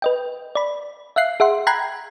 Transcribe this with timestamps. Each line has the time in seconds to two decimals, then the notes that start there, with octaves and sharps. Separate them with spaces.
0.02 B4 D#5 G5
0.55 D5 B5
1.16 E5 F5 F#6 C7
1.40 G#4 E5 F#5 C6
1.67 G5 A#5 B5 F#6 G#6 C7